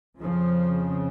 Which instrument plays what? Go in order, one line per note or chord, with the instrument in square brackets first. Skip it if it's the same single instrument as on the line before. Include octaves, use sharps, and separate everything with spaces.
[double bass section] F2 C#3 F3